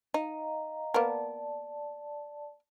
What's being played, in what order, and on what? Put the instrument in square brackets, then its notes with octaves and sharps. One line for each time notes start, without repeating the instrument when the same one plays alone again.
[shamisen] D#4 [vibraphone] D#5 F5 A#5
[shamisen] A#3 B3 A#4 [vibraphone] D5 A5